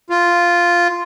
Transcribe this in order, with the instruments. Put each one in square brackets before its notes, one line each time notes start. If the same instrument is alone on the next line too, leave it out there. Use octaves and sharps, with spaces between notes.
[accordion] F4